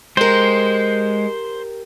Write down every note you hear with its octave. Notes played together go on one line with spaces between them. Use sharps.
G#3 G4 A#4 C5